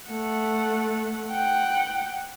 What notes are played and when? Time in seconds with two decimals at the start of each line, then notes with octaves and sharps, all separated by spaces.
0.10 A3 F#5
1.31 F#5 G5